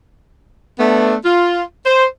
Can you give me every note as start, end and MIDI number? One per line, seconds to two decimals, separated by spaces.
0.79 1.16 57
0.79 1.16 59
0.79 1.16 62
1.25 1.63 65
1.86 2.05 72